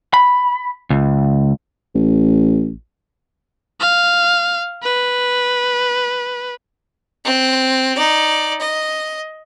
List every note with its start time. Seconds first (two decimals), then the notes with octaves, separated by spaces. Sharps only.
0.14 B5
0.90 C#2
1.95 A1
3.80 F5
4.83 B4
7.25 C4
7.95 D#4 D5
8.60 D#5